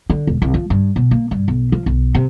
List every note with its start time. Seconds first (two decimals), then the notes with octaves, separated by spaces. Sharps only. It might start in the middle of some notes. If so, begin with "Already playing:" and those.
0.10 D3
0.27 E1
0.42 C2
0.54 F3
0.70 G2
0.96 B2
1.11 A#3
1.31 G2
1.48 B1
1.72 F3
1.86 B1
2.15 C3